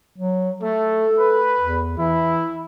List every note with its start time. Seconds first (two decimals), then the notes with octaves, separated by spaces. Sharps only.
0.18 F#3
0.62 A3 A4
1.19 B4
1.60 E2
1.98 E3 E4